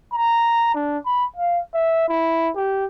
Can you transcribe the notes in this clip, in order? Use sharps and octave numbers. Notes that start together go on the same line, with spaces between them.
A#5
D4
B5
F5
E5
E4
G4